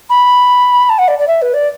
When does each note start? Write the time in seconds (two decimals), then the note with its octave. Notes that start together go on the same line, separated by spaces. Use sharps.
0.10 B5
0.89 A5
0.98 F#5
1.08 D5
1.19 D5
1.28 E5
1.42 B4
1.54 D5